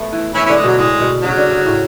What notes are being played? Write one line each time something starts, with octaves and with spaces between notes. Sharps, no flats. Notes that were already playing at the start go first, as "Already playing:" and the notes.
Already playing: A3 B3
E3
E3 C#4 E4
C#4 E4
D3
G#3
B2 F#3
A2 G#3
B2
C#3 F#3
D3
C#3
A2